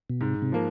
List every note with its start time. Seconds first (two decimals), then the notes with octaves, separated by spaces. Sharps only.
0.10 B2
0.21 G#2 C3
0.42 C3
0.52 F3 A#3